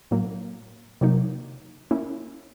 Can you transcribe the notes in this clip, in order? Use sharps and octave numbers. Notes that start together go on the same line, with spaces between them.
A2 F#3 A#3
C3 D#3 F#3 A#3 D#4
A#3 C#4 E4